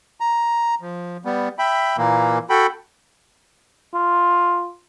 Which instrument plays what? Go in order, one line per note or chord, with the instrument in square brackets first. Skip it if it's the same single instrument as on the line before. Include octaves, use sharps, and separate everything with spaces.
[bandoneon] A#5
F3
G3 B3
E5 G5 B5
A#2 E3 A#3
F#4 A4 G5 B5
[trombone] F4